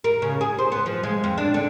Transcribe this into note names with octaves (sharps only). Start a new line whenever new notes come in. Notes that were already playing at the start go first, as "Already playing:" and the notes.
A#4
C#3
G#4
C5
B3
F3
G#3
F2
D4
D3